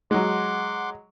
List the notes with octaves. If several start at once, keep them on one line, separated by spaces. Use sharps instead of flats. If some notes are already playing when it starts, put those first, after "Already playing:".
F#3 G#3 F#5 C6 D6